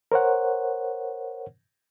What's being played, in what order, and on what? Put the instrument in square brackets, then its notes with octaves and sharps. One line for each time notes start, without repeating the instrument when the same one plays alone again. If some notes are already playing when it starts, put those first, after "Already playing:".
[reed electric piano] A#4 C5 C#5 F#5